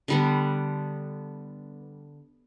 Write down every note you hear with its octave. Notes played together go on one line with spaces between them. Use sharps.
D3 G3 B3